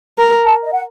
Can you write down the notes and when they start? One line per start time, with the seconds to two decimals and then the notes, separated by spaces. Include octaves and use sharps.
0.18 A#4 A#5
0.45 A5
0.64 D#5
0.72 F#5